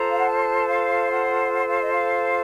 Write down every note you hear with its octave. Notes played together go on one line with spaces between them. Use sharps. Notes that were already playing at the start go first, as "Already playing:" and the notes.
Already playing: F4 A4 C5 A#5
F5
F#5
A5
F5
F#5
F#5
F5
D#5
F5